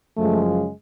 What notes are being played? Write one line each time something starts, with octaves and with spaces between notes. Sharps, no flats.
F#2 C#3 F3 G#3 A3